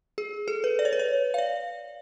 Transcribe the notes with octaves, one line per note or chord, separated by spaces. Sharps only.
G#4
A4
B4
D5
C#5
B4
C#5
F5
D5